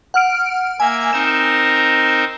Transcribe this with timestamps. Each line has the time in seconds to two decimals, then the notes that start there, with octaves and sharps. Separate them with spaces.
0.14 F#5 F6 D7
0.80 A#3 E5 G#5
1.13 C4 D#4 A#4 E7